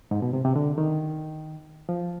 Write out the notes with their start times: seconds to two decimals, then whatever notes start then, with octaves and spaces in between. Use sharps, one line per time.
0.11 G#2
0.22 B2
0.33 C3
0.45 C3
0.56 D3
0.78 D#3
1.89 F3